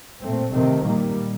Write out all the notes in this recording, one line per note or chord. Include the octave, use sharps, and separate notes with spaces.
A#2 A3 C4
C3 D#3 A3 C4
A#2 G3 A#3